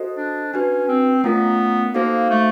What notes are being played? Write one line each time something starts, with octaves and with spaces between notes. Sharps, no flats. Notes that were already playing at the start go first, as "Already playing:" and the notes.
Already playing: F#4 A4 C5 D#5
D4
C#4 D4 F#4 B4
C4
A3 B3 C#4 F4 A#4
A#3 D#4 F#4 A4 C5 F5
A3